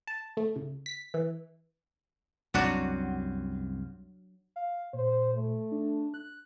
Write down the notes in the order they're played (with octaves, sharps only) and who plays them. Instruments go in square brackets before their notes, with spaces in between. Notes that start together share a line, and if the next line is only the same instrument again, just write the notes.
[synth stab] A5
A3
C#2
B6
E3
[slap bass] C2 F#2 C3 [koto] F#3 D4 F#4
[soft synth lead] F5
[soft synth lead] A#2 [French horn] C5
[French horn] A3
[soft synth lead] D4
F#6